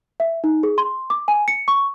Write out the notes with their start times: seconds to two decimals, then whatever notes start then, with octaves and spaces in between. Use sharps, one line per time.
0.20 E5
0.44 D#4
0.63 G#4
0.78 C6
1.10 D6
1.28 G#5
1.48 C#7
1.68 C#6